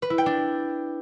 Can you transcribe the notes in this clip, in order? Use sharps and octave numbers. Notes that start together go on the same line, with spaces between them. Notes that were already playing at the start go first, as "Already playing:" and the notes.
B4
E4
G5
D4